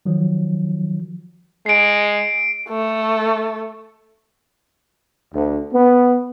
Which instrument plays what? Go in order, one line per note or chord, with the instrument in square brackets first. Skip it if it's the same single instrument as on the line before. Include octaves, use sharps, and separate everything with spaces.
[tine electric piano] D#3 F3 F#3
[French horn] G#3 [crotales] C7 D7
[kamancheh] A3
[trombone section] D2
B3